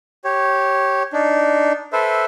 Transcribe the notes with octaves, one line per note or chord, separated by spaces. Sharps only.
G4 C#5
D4 D#4
A4 B4 C5 E5